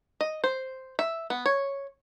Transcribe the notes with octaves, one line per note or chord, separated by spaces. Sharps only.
D#5
C5
E5
B3
C#5